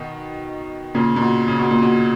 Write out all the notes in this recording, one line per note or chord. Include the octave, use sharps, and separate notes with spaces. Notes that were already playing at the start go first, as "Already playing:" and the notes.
Already playing: B2 D#3
A#2 C#3
A#2
B2
C#3
B2
A#2
B2